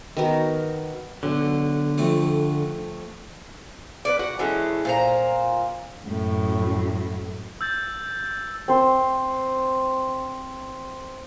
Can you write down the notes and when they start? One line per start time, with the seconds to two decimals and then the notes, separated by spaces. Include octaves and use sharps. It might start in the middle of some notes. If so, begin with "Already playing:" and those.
0.17 D#3 B3 F#4 A#4
1.23 B1 D3
1.98 F2 A3
4.05 B4 C#5 D5
4.19 F#4 F#5
4.39 E3 G#3 A3 C#4
4.85 A#2 C5 A#5
6.04 F#2 A2
7.61 E6 G6 A6
8.68 C4 C5